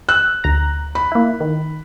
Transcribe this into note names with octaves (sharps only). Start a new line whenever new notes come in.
E6 F#6
D2 A#5
B5
A#3 E4
D#3